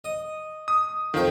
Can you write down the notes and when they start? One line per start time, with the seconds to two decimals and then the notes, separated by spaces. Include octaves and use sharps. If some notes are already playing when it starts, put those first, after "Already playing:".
0.04 D#5
0.68 D#6
1.14 F2 D#3 F3 G5